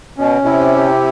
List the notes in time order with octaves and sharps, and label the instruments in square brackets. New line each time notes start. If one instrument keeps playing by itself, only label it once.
[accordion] B2 [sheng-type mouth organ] C#4
[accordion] B2
[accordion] C3 [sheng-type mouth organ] E4
[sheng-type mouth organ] G4